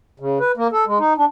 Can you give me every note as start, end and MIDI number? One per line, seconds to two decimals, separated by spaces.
0.20 0.39 49
0.40 0.52 71
0.57 0.67 58
0.72 0.85 69
0.87 0.98 56
0.99 1.13 63
1.18 1.25 62